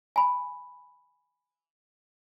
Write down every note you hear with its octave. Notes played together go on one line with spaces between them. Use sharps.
G#5 B5